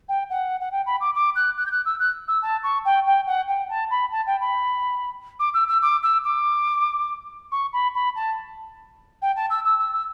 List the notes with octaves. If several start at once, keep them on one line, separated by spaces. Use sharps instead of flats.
G5
F#5
F#5
G5
B5
D6
D6
F#6
F#6
G6
F#6
E6
F#6
E6
A5
C#6
G5
G5
F#5
G5
A5
B5
A5
G5
B5
D6
E6
E6
D6
E6
D6
C#6
B5
B5
A5
G5
A5
E6
E6
E6
E6